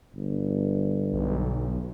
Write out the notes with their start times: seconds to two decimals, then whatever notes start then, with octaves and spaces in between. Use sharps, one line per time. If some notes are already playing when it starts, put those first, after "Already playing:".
0.15 G1
1.12 B1